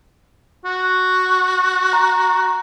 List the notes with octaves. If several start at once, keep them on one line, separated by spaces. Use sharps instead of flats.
F#4
A#5